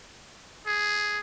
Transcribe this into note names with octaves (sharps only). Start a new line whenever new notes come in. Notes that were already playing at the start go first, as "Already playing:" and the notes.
G#4